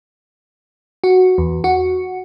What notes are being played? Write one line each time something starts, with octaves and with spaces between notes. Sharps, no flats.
F#4
E2
F#4